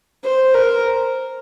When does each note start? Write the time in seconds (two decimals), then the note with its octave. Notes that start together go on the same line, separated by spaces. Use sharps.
0.24 C5
0.54 A#4